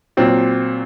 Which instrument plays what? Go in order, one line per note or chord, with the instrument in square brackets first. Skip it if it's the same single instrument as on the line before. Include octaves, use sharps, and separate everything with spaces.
[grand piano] A#2 F#3 C4